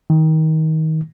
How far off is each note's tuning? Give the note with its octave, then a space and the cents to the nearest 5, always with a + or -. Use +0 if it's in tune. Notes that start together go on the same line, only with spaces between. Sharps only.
D#3 +25